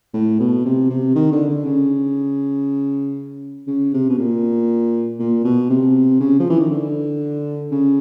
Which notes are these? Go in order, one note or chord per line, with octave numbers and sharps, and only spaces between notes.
A2
B2
C3
C3
D#3
D3
D3
C#3
C#3
C3
B2
A#2
A#2
B2
C3
C#3
F3
E3
D#3
D3
C#3